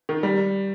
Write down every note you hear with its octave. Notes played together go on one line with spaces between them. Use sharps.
D#3
G3